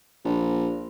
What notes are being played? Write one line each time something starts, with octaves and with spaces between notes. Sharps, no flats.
A#1